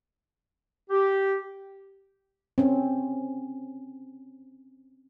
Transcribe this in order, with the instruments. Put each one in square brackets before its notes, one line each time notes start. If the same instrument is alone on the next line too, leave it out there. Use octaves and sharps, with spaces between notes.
[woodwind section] G4
[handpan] C4 C#4